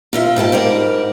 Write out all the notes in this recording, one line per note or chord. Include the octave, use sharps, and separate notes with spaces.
A#2 F4 E5
G#2 G4 B4 A5
G#2 G3 A#4 D5